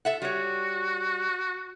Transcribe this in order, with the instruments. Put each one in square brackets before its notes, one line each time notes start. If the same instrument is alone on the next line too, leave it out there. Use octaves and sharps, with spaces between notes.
[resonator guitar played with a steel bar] A4 E5 F#5
[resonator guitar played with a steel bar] G3 C#5 [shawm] F#4